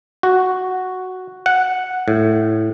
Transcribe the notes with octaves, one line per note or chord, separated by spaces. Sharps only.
F#4
F#5
A2